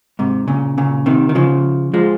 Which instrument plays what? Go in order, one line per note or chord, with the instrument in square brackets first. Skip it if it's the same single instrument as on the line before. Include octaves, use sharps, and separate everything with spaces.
[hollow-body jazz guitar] G#2 C3
A#2 C#3
A#2 C#3
C3 D#3
D#3
C#3 F3
F3 G#3